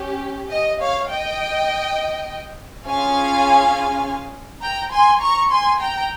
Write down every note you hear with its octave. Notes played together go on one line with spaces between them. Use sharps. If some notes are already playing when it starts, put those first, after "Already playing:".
Already playing: C#4 G4
D#5
C#5 F5
D#5 G5
C#4 F4 G#4 F5 G#5
G5 A#5
G#5 C6
A#5 C#6
G#5 C6
G5 A#5